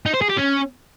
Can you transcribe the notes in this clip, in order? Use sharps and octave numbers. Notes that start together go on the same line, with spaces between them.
D#4
C5
G#4
G4
C#4